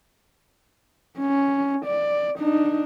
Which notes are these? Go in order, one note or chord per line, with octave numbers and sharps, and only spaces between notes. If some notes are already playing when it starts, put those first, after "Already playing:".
C#4
D5
D4 D#4